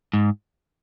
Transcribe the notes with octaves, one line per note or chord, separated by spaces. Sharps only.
G#2